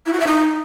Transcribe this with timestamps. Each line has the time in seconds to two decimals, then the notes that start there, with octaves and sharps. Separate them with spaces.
0.05 E4
0.12 F#4
0.19 E5
0.26 D#4